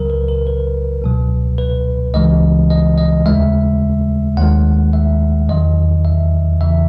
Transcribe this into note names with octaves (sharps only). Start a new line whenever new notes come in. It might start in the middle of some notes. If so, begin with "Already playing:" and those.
Already playing: C#2 C#3 F#3 A#4
B4
A#4
B4
C#2 B2 F#3
B4
C#2 C#3 E3 G#3 D#5
D#5
D#5
D#2 C#3 G#3 E5
D#2 D#3 G#3 F#5
E5
E2 D#3 F#3 D#5
E5
E2 C#3 E3 E5